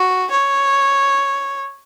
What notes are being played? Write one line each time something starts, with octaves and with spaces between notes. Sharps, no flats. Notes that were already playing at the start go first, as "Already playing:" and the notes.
Already playing: F#4
C#5